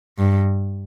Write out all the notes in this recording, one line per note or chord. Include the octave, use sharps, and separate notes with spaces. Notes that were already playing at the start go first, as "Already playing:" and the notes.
G2